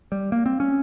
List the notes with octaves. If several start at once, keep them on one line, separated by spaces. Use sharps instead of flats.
G3
A#3
C4
C#4